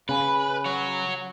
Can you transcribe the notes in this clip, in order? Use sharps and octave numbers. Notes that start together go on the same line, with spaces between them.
C#3 B4 F5 G#5 B5
F#4 C#5